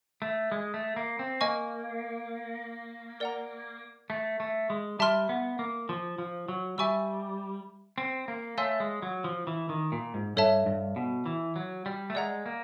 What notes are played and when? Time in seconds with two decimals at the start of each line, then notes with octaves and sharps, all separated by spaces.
0.22 A3
0.52 G#3
0.74 A3
0.96 A#3
1.19 C4
1.41 A#3 D#5 G#5 C#6
3.20 A#4 D5 F#5 A#5
4.10 A3
4.40 A3
4.70 G#3
4.99 G3 E5 A5 C6 F6
5.29 B3
5.59 A#3
5.89 F3
6.18 F3
6.48 F#3
6.78 G3 E5 G#5 C#6 E6
7.98 C4
8.28 A#3
8.58 A3 C#5 F5 G#5 C6 E6
8.80 G#3
9.02 F#3
9.24 F3
9.47 E3
9.69 D#3
9.92 A#2
10.14 G#2
10.36 G2 A4 C#5 E5 A5
10.66 G2
10.96 B2
11.26 E3
11.56 F#3
11.86 G3
12.10 A3
12.15 G#3 D5 F#5 A#5
12.46 A#3